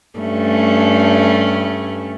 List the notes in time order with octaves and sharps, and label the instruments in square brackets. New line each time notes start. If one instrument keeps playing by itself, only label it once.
[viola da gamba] G2 A3 C#4